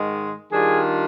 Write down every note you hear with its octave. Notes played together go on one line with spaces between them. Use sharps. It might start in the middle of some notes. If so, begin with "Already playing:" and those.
Already playing: G#2 D#3 G#3
D#3 G3 D4 F4 G#4